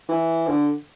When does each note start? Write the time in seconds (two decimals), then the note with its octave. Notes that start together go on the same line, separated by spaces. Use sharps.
0.09 E3
0.47 D3